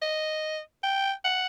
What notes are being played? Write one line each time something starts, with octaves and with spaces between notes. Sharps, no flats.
D#5
G5
F#5